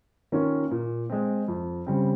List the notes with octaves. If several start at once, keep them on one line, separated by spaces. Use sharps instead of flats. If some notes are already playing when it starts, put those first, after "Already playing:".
D#3 A#3 C#4 F4
A#2
G#3 C4
F2
C#3 G3 C4